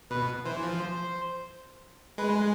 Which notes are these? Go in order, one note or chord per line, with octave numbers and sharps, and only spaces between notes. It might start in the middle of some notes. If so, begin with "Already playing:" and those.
B2 B4
E3 C5
F3
C5
G#3 B4